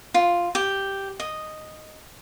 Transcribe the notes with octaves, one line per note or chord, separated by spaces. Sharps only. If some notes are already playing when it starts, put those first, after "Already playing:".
F4
G4
D#5